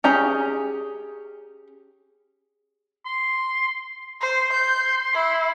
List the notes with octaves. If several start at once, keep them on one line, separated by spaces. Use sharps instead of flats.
C#4 G4 G#4 A#5
C6
C5 C6
G6
E4